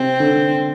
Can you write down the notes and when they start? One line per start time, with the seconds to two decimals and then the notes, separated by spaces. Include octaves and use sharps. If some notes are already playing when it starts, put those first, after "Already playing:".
Already playing: C3 C4
0.20 D3